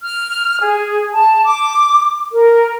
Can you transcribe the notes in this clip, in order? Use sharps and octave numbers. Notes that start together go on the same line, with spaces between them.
F6
G#4
A5
D6
A#4